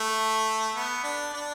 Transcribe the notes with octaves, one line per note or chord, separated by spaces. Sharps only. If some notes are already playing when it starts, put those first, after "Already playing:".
Already playing: A3
B3
D4
D4